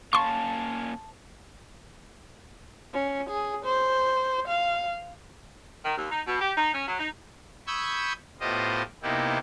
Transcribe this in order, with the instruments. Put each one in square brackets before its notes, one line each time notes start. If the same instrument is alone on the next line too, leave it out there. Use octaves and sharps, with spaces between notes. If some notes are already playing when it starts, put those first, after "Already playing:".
[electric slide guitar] A#3 C#4 F5 [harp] A5 [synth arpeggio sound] C6 C#6
[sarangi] C#4
G#4
C5
F5
[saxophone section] D#3
D#2
D#4
B2
G4
D#4
C#4
F#3
D#4
[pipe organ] B5 C#6 D#6 E6 G6 G#6
A2 B3 F4 G4 C5 D#5
C3 A#3 B3 D#4 E4 G4